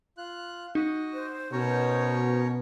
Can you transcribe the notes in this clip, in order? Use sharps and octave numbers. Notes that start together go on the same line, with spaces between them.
F4 F#6
D#4 F#4 D#5
C5
B2 C#4 A#4 C#5